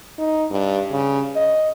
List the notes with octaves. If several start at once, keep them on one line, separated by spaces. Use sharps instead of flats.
D#4
G2
C#3
D#5